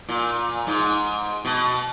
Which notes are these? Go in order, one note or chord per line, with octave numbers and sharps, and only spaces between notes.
A#2
G#2
B2